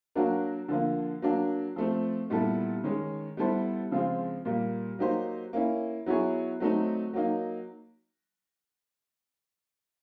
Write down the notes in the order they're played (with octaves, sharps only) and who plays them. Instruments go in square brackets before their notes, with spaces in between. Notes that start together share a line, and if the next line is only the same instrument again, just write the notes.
[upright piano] F#3 A#3 D4 F#4 A#4
D3 F3 A#3
F#3 A#3 D4
F3 A3 C4
A#2 G3 B3 E4 A4
D#3 G#3 C#4
G3 B3 E4 A4 C5
C#3 F3 G#3 C4 F4
A#2 G3 A#3
F#3 A#3 D#4 G4 C5
A#3 C#4 E4
F#3 B3 E4 G#4 C#5
F#3 A3 C4 D#4
F#3 A#3 D#4